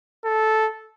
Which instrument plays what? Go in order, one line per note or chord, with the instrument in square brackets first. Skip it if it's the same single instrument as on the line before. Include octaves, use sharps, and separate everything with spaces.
[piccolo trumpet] A4